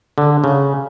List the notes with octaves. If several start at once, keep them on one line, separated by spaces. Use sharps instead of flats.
D3
C#3